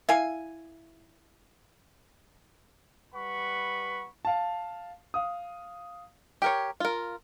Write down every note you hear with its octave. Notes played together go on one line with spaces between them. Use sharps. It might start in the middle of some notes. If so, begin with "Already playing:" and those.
E4 F5 G#5
G3 B4 F#5 B5 C#6
F5 A5
F5 D#6
G4 A#4 C#5
F4 A#4